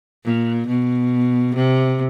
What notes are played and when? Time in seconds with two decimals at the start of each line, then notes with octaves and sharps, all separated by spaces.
0.25 A#2
0.68 B2
1.55 C3